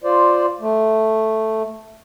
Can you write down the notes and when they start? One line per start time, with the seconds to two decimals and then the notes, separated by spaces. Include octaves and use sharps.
0.04 F4 C5 D5
0.60 A3